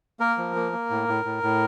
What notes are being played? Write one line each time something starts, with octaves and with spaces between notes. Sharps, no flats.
A#3 A#4
F3
A#3
A#3
A2
A2
A2
A2